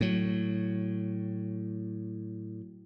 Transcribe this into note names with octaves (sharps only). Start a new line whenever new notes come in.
A2 F#3